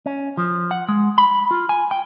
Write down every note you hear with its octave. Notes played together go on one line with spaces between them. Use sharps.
C#4
F3
F#5
G#3
B5
F4
G#5
G5